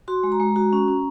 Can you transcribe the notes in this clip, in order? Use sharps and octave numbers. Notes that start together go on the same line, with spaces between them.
F#4 C6
G#3
A#5
G#3
F#4
C#4
C#4